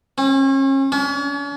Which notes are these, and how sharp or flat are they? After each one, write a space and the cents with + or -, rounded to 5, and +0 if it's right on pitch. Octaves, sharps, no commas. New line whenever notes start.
C#4 -40
C#4 +40